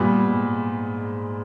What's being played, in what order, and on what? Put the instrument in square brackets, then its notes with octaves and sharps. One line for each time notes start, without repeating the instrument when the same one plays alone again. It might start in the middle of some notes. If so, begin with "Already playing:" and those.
Already playing: [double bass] G2 [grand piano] A#2 G3 B3
[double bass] G#2